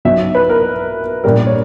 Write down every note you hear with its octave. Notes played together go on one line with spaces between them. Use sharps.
B1 B2 F#3 E5
B4
A#4
A#1 A#2 G3 A#4
C#5